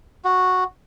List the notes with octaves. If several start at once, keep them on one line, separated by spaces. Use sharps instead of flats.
F#4